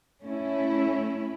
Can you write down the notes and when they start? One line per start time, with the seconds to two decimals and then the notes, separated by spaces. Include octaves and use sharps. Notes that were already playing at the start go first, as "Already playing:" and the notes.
0.22 A3 C#4 E4